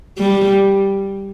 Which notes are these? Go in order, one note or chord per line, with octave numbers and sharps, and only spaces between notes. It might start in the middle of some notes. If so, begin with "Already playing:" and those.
G3